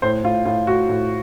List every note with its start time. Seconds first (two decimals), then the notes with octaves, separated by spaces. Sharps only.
0.02 A2 C5
0.23 A2 F4
0.45 A2 F4
0.67 A2 F#4
0.89 A2